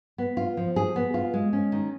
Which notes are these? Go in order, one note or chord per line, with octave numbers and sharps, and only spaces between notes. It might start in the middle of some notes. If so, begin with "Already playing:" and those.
B3
F4
F3
G#4
B3
F4
G#3
C#4
D#3